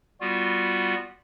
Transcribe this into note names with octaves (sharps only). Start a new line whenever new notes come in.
G3 B3 F4 F#4